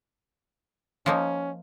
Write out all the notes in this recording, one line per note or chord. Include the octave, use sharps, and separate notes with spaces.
F3 A#3 C#4 D#4